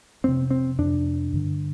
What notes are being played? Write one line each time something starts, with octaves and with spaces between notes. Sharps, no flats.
F2 C3 C4
C4
F2 C3 D4
G2 D3